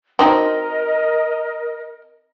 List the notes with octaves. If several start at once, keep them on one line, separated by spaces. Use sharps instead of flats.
C4 D#4 F#4 A#4 D#5